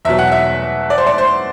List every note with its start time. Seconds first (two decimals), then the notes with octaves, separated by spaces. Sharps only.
0.05 E2 B2 F#3 E5
0.19 F#5
0.32 E5
0.90 D5
0.98 C5
1.06 D5
1.18 C5